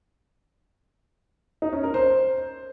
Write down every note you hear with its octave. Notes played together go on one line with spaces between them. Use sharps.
D#4
C#4
A#4
C5